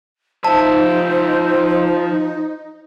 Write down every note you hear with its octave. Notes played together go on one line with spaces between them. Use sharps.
F3 D#4 C5 E5 A5